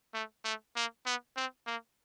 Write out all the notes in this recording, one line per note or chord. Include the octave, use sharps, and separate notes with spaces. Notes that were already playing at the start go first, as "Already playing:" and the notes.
A3
A3
A#3
B3
C4
A#3